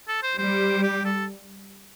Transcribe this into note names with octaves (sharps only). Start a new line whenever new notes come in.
A4
C5
G3 C5
G4
A4